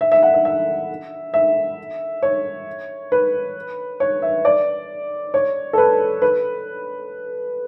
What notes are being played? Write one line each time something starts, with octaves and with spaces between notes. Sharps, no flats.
E5
E5
F#5
E5
E5
E5
C#5
B4
C#5
E5
D5
C#5
A4
B4
B4